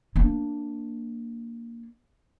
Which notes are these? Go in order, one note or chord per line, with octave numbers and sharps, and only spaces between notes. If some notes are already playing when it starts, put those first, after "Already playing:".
A#3 D4